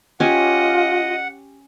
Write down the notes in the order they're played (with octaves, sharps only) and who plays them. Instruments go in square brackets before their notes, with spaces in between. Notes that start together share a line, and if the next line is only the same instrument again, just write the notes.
[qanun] C#4 G4 [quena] F4 [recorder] D#5 [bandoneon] F#5